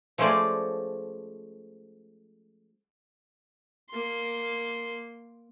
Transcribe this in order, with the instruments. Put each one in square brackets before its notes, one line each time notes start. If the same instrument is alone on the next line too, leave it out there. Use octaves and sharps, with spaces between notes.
[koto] F3 G#3 A3 C#4 C5 D5
[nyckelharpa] A#3 C6